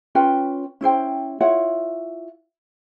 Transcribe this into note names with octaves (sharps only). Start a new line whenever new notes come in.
C#4 F4 B4 G5
C#4 E4 C5 G5
E4 F4 C#5 F#5